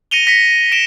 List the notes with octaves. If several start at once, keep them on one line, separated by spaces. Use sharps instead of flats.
A#6 C#7 D#7 F7 G7
A#6 B6 C#7
B6 D7 E7 G7